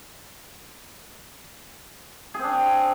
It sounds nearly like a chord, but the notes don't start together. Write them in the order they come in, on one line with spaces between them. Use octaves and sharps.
G#4 C4 D4